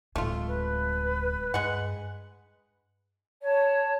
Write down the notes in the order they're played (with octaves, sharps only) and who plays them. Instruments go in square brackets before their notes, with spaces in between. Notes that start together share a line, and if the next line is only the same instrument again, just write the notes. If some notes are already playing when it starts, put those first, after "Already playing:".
[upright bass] D1 G#3 [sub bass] D2 [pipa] A3 F4
[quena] B4
[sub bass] G2 [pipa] G#3 F#5
[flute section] C#5 A5